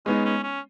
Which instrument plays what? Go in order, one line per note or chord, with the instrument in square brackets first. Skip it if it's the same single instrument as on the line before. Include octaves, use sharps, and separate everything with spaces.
[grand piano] G#3 B3 D#4 [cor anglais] C#4
[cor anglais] C#4
C#4